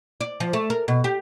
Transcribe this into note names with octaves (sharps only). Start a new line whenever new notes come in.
D5
F3
A3
A#4
B2
G4